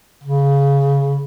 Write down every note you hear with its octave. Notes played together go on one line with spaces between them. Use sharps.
C#3